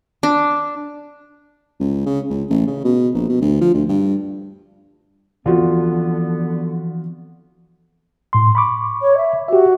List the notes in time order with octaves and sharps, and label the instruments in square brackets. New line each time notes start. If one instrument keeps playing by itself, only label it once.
[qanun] D4
[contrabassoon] C#2
C#3
C#2
A1
C#3
B2
A#1
B2
D2
F3
D2
G2
[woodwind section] D3 B3 [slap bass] E3 F3 C4 [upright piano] F4 F#4
[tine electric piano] A2 C6
B5 C#6 D6
[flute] C#5
E5
[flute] F#4 [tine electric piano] G4 E5